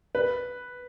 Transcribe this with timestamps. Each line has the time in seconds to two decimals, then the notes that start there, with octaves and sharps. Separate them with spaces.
0.15 B4